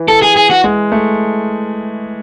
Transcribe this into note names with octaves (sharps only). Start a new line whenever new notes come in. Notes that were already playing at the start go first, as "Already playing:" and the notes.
Already playing: E3
A4
G#4
G#4
F#4
G#3
A3